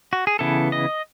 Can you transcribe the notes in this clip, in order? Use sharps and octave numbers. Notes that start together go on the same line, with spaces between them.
F#4
G#4
C#3 E3 B3 E4 A4
D#5